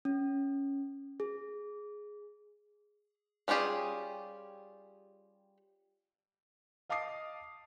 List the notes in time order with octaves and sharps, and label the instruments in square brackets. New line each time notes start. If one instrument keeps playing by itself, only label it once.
[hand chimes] C#4
G#4
[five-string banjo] G3 C#4 F4 G4 G#4
[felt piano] D#5 F5 A5 D6 D#6 C7